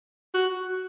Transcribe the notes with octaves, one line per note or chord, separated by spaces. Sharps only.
F#4